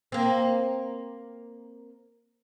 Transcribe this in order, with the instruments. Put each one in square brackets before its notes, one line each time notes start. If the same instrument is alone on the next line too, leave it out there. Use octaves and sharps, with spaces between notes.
[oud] A#3 C4